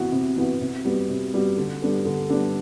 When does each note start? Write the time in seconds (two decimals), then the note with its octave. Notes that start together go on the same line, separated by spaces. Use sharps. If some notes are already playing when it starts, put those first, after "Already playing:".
Already playing: C3 E3 B3 F#4
0.12 C3
0.37 E3 B3 F#4
0.62 C3
0.85 G3 B3 F#4
1.10 C3
1.33 G3 B3 F#4
1.57 D3
1.82 G3 B3 D4 A4
2.05 D3
2.30 G3 B3 D4 A4